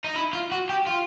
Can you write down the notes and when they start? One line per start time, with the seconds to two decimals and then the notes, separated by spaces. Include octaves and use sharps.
0.05 D#4
0.16 E4
0.33 F4
0.52 F#4
0.69 G4
0.87 F4